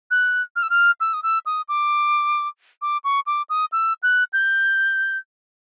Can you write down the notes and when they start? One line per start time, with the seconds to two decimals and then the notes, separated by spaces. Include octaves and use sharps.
0.11 F#6
0.56 F6
0.63 E6
0.70 F6
1.01 E6
1.14 D#6
1.23 E6
1.46 D#6
1.69 D6
2.82 D6
3.04 C#6
3.27 D6
3.50 D#6
3.72 E6
4.03 F#6
4.33 G6